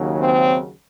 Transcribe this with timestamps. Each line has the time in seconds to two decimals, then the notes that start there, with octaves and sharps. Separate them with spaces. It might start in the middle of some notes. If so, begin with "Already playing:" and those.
Already playing: D#2 C#3 F#3
0.20 C4